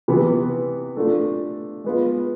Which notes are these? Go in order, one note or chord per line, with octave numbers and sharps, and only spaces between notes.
C3 E3 B3
A3 D4 F4 A4
G#3 B3 F4